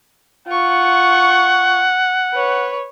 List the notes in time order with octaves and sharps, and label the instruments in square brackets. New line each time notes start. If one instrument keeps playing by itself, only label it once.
[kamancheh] F4 C#6 [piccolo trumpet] F#5
[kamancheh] B4 C#5